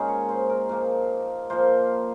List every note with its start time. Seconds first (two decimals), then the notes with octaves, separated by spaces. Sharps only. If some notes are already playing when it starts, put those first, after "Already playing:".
Already playing: A#2 G#3 C#4 D#4
0.09 C#5
0.29 C5
0.49 A#4
0.69 A#2 F3 A#3
1.50 A#2 F3 A#3 C5